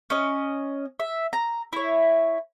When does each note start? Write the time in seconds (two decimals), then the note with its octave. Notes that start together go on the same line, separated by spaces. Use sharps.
0.10 C#4 D#5
1.00 E5
1.33 A#5
1.73 E4 C#5